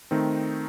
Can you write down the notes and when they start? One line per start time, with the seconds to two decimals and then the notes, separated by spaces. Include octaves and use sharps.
0.11 D#3 A3 C4 D#4